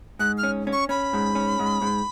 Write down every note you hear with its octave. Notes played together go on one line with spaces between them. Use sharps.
G#2 F#6
F6
C#4
C#4
C#6
C#4 B5
G#2
C#4
G#2
G#2